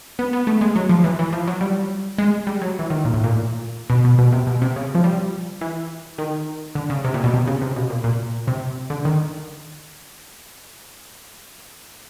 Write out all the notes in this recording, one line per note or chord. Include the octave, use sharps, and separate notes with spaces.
B3
B3
A3
G#3
F#3
F3
E3
E3
F3
F#3
G3
G#3
G3
F#3
E3
D#3
A#2
A2
A#2
B2
B2
B2
C3
B2
C3
C#3
F3
G3
E3
D#3
D3
C#3
C3
A#2
B2
C3
C#3
C3
B2
A#2
A#2
C3
D3
D#3